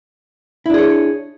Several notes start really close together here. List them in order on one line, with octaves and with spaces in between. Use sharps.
E4 D4 G#4 C#5